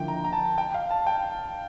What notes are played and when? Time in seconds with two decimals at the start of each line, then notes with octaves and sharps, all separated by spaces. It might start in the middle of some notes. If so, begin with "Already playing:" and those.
Already playing: D3 F3 A#3 E4 G5
0.08 A#5
0.24 A#5
0.33 A5
0.58 G5
0.74 F5
0.91 A5
1.07 G5